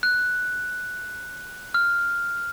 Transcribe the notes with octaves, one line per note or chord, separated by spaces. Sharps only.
F#6
F6